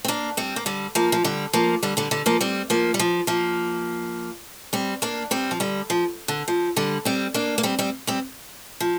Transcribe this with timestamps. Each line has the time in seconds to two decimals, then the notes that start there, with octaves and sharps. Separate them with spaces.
0.04 C4
0.08 A#3 D4
0.37 G3 C4
0.56 A#3
0.66 D3 G3
0.95 F3 A#3
1.12 F3
1.24 D3 G3
1.53 F3 A#3
1.83 D3 G3
1.97 D3 G3
2.11 D3 G3
2.26 F3 A#3
2.41 G3 C4
2.70 F3 A#3
2.94 G3
2.99 F3
3.27 F3 A#3
4.73 G3 C4
5.02 A#3 D4
5.31 G3 C4
5.51 F3
5.60 D3 G3
5.90 F3
6.28 D3
6.48 F3
6.76 D3 G3
7.05 G3 C4
7.34 A#3 D4
7.58 A#3
7.63 G3 C4
7.79 G3 C4
8.07 G3 C4
8.80 F3